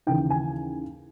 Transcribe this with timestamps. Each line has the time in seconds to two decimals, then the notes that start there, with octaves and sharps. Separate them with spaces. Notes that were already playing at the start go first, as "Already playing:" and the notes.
0.07 D#2 C#3 E3 G5
0.30 G#5